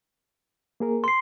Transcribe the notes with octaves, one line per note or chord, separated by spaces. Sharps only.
A#3 G#4 A#4
C6 C7